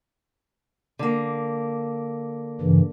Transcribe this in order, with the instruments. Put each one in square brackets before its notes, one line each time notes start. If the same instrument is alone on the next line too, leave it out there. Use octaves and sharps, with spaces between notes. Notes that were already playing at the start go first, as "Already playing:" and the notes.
[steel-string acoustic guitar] D3 A#3
[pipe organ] G2 C#3 E3